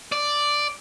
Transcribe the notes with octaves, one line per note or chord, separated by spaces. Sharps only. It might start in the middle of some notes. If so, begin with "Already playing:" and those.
D5